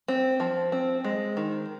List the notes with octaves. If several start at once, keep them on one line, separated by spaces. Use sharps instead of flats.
C4
F3
C4
G#3
D#3